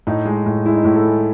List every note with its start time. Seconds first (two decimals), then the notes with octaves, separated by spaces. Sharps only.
0.07 A2 D#4
0.25 G#3
0.46 A2
0.65 G#3 E4
0.74 D#4
0.82 A2 E4
0.96 A4
1.05 G#3